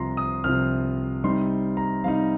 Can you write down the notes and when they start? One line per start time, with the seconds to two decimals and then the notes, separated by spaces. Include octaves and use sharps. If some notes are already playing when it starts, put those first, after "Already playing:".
Already playing: C2 C3 F3 A#5 C6
0.17 D#6
0.44 C2 C3 F3 F6
1.24 C3 G3 D#4 C6
1.77 A#5
2.03 C3 G3 D#4 F5